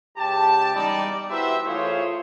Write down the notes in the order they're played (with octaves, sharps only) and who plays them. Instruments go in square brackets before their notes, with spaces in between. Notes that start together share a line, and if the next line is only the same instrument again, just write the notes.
[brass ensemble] C#2 G4 A5
E2 G3 D#4 D5
E4 F#4 G4 B4 C5 E5
E3 A3 F4 G#4 C5 C#5